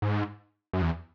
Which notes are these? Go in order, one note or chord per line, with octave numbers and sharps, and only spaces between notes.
G#2
F#2
E2